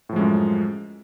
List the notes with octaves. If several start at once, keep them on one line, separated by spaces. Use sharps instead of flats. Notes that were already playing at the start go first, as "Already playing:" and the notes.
F#2 A2 F3 G#3